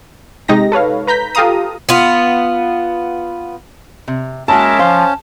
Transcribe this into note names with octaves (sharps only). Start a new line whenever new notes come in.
C3 G#3 D#4 G4 A#6
A4 B4 C#5 F5
B4 A#5 G6 B6
F4 G4 A4 F5 A#5 D#6
B3 F4
C3
G#3 A#3 C#4 F#4 A#4 E5 A5
F3 C5 F5